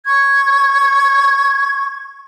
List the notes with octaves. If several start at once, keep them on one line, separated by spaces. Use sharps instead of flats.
C#6 G#6